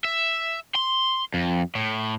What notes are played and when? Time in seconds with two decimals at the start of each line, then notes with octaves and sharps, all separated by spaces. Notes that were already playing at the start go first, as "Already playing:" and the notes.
0.04 E5
0.76 C6
1.34 F2
1.75 A2